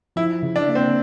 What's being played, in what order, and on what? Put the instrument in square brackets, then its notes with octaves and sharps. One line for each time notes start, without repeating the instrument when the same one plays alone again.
[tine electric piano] F3 [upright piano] E4
[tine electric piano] C#3
[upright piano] D4
[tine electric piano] A#3
[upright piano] C4